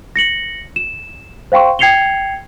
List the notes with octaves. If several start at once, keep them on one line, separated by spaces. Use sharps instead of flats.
A#6 C#7 F#7
E7
C5 F5 G5 C6 C#6
G5 G#6 C7 C#7 F7 G7